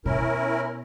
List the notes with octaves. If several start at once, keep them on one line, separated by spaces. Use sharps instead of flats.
B2 C#4 E4 A#4